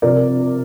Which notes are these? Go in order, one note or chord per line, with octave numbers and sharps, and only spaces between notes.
C3 F3 A#4 D5